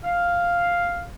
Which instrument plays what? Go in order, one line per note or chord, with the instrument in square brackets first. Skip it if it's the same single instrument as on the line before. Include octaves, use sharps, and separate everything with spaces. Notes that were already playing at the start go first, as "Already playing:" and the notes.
[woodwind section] F5